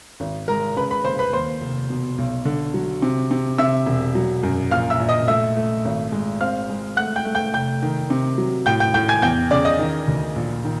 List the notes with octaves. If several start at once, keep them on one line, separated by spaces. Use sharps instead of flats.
G#1
G#3 A#4 A#5
C#3 B4 B5
B4 B5
F#1 C5 C6
B4 B5
D#2 C5 C6
F1
B2
B1
D3
F#3
C3
C3
C3 E5 E6
E1
F#3
F#2
A#1 F5 F6
E5 E6
A#1
D#5 D#6
A3 E5 E6
A3
G#1
G#3
C4 F5 F6
G#3
A3 F#5 F#6
G5 G6
A3
G5 G6
F1 G5 G6
D#3
C3
F#3
A2 G5 G6
G5 G6
A2 G5 G6
G#5 G#6
E2 G5 G6
C#3 D5 D6
D#5 D#6
D#3
D2
A#1
D#3